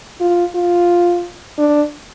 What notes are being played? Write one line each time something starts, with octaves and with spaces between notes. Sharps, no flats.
F4
F4
D4